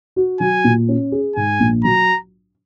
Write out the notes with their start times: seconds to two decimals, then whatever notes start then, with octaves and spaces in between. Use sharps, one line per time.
0.16 F#4
0.40 F#3 G#5
0.64 A#2
0.89 C#4
1.12 G#4
1.36 G#2 G#5
1.60 A#1
1.84 F#3 A#5